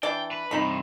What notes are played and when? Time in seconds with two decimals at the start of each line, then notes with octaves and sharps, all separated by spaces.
0.03 E3 D4 D5 G5
0.31 B4
0.51 G2 C3 D#4 B5